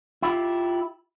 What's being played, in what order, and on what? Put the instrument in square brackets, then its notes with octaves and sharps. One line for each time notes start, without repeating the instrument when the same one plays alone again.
[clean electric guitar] E4 F4 G4